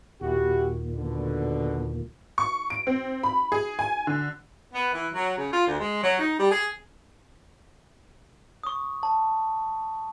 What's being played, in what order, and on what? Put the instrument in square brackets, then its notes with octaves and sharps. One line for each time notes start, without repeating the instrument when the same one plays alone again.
[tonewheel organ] D#2 A#2 [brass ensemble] E4 F#4 G4
[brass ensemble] B2 D3
[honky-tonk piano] C#6
D7
C4
B5
G#4
G#5
D3
[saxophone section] B3
E3
F#3
C#3
F4
D2
G#3
F#3
D#4
G3
G#4
[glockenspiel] C#6 D#6
A5